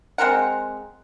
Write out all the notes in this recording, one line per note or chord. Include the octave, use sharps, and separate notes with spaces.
G#3 C4 A#4 F#5